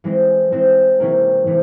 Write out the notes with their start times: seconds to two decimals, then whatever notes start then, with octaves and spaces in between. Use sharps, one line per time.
0.04 E3 G#3 C4
0.52 E3 G#3 C4
1.00 C3 E3 A#3 C#4
1.47 C3 E3